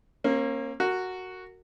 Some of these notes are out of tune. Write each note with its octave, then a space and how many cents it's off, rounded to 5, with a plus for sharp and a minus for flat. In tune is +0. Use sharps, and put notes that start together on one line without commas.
A#3 +0 C#4 -40
F#4 +0 A#4 -25